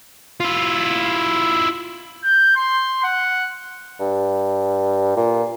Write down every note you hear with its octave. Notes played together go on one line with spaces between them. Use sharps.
E4 F4
G6
C6
F#5
G2
A#2